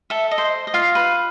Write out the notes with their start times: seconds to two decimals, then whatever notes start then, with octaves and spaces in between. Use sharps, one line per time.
0.10 A4 E5
0.31 D#5
0.38 C5
0.67 D#5
0.74 F4 F5
0.95 B4